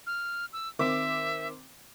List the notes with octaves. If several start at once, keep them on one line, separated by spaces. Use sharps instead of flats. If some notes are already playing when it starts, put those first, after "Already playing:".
F6
E6
D#3 C4 E5 D6